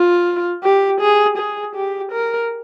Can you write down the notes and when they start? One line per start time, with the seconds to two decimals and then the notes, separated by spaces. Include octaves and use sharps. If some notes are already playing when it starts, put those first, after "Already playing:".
Already playing: F4
0.63 G4
1.00 G#4
1.38 G#4
1.75 G4
2.12 A#4